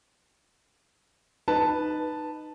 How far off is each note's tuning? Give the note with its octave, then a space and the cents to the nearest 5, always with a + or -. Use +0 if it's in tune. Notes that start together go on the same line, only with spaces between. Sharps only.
D#4 -15 B4 +0 A5 +0